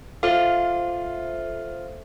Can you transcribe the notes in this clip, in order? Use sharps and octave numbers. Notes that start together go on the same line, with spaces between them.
F4 A4 C5 E5